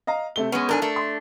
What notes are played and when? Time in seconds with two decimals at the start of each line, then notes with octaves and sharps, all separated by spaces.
0.07 D#5 F5 A#5
0.36 C3 A3 G7
0.52 G#3 B3 C#4
0.69 G#2 D4 A4 A#4 G#5
0.82 A3 D4
0.96 C6